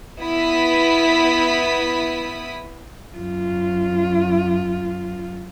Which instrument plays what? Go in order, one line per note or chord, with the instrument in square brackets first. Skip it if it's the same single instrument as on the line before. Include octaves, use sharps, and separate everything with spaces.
[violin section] B3 E4 D#6 B6
[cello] F#2 F4